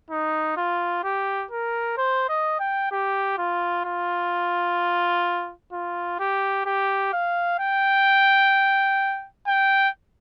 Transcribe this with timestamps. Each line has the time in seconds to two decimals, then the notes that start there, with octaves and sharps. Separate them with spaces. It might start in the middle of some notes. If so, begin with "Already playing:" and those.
0.10 D#4
0.57 F4
1.04 G4
1.51 A#4
1.98 C5
2.29 D#5
2.60 G5
2.92 G4
3.38 F4
3.85 F4
5.73 F4
6.19 G4
6.66 G4
7.13 F5
7.59 G5
9.47 G5